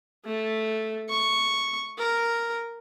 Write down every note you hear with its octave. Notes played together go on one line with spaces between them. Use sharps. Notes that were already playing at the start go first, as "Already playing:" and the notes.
A3
C#6
A#4